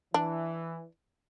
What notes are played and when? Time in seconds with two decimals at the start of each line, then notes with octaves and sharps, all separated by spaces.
0.14 E3 D4